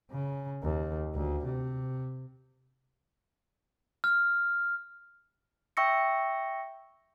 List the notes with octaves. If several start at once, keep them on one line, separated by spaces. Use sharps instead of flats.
C#3
D#2
D2
C3
F6
E5 G5 C#6 E6 A#6 C#7